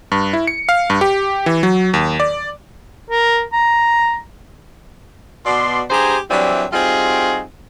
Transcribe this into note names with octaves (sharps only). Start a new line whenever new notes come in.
G2
E4
C#7
F5
G2
G4
E3
F#3
D#2
D5
A#4
A#5
B2 D5 C6
G2 G4 G#4 C5 G#5 A#5
E3 F#3 G3 C4 D4 E4
G3 C4 D#4 F4 F#4 G#4